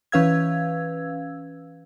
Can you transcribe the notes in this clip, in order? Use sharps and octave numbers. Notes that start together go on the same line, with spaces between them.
E3 C#4 B4 F5 E6 G#6